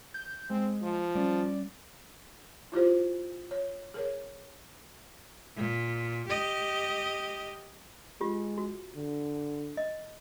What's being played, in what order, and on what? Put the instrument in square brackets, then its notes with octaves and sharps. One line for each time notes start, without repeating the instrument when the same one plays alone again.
[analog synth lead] G6
[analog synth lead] G#3 [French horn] C4
[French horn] F3
[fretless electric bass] G3 C#4 [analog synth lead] D5
[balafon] E4 F4 G4 C5
C#5
G#4 A#4 C#5
[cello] A#2
G4 D#5
[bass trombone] G#3 [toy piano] F4 G4
[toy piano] F#4
[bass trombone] D3
[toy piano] D#5